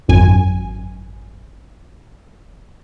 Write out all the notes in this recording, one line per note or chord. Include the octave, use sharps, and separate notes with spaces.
G#1 F#2 G#5